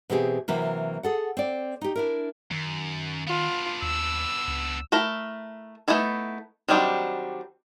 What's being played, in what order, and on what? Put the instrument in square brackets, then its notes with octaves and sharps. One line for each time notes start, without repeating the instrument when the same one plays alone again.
[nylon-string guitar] B2 E3 C4 G4 G#4
C3 E3 F#3 A#3
G#4 A4 F#5
C4 D5
D#4 G4
D4 E4 A#4
[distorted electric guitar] F#2 [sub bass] D#3
[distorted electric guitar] B3 D4 [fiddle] F4
[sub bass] D#2 [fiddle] E6
[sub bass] C#2
[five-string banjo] A3 E4 A4 A#4 E5
A3 B3 D#4 E4 A4
D#3 F#3 G3 C4 D4